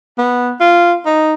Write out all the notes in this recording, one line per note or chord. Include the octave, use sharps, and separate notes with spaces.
B3
F4
D#4